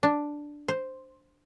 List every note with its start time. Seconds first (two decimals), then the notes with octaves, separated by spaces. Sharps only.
0.03 D4
0.68 C5